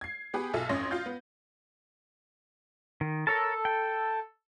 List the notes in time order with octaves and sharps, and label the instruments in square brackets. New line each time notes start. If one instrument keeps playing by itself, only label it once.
[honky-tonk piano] G#6 C7
B3 G4 G#4 B4
B1 F4 A4 E5 G#5
A1 F2 C#4 C#5 C6 A#6
F4 F5 G6
B3
[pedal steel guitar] D#3
[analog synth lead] A4 [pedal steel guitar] A#4 C#5 A5
[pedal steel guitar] G5